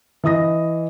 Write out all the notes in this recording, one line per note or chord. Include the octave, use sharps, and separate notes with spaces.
E3 D#5 D#6 A#6